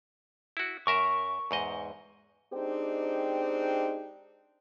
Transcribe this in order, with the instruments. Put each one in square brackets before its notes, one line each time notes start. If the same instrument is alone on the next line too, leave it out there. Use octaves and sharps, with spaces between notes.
[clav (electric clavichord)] E4 F#4
[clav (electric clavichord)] F#2 A#4 E5 [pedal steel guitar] C#6
[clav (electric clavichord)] E2 G#2 D#5
[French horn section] G#3 C4 D4 D#4 G4